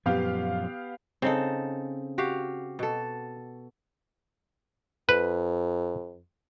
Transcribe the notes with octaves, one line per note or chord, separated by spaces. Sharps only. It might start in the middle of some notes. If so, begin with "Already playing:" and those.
F#2 A#2 F3 B3 G4 F5
C#3 C4 D#4 A4
F#4 G4 F5
B2 A4
F2 B4